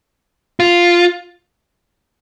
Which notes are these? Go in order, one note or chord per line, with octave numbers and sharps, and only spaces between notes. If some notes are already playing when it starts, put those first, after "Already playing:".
F4